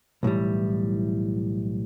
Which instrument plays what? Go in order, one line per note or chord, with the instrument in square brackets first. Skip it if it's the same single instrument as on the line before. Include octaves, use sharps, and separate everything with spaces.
[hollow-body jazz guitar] B1 A2 E3 G3